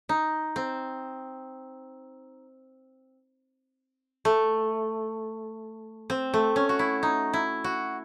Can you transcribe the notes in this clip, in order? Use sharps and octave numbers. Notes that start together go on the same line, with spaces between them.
D#4
C4
A3
C4
A3
C#4
F#4
E4
D#4
E4
F#4